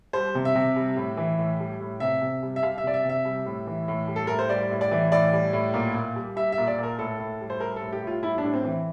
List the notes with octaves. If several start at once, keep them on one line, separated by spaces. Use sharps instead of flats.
G3 C5
C3
E5
C3
G3
A2
E3
A2
G3
A2
C3 E5
C3
G3
E5
G3 F5
E5
C3 D5
E5
C3 E5
G3
A2
E3
A2
G3
A4
A2 A#4
C5
G3 D5
A2
D5
E3
A2 D5
G3
A2
A#2
A#2
G3
G3 E5
E5
A#2
D5
A#2 A#4
A2 A4
A2
G3
C5
G3 A#4
A2 A4
G4
A2 F4
G3 E4
D4
A2
C4
E3